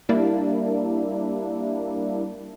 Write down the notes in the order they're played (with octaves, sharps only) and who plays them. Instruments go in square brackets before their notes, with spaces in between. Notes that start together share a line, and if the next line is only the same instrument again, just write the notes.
[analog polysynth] G3 A#3 D4 E4